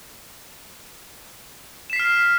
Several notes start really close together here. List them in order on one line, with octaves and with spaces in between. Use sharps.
E7 B6 C7 F6